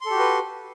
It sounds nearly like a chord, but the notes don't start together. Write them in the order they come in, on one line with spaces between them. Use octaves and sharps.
C6 A4 G4 F#4 B4